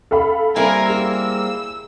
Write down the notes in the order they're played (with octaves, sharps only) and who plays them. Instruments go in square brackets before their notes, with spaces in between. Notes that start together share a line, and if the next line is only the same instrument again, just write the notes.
[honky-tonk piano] A4 F5 B5
[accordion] G3 A#3 [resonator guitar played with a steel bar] C4 E4 [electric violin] A#4 G#5
[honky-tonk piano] G#4 [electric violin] E6